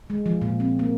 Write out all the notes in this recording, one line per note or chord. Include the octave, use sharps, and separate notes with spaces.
G#3
F3
A#2
C4
A#3